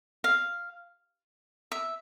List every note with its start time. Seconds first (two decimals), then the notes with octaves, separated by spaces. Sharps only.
0.24 F5
1.72 E5